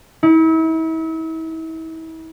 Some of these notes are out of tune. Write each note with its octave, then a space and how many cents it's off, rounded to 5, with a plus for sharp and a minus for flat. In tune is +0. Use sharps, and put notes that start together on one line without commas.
E4 -40